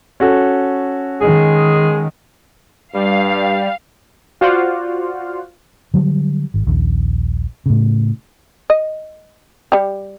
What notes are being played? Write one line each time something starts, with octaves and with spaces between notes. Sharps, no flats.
C#4 F#4 A4
D#3 G#3 G#4
G2 G3 F5
F4 F#4 C5 D5 F5 F#5
D3 F#3 G3
G#1
A#1 D#2
A2 C#3
D#5
G3 G4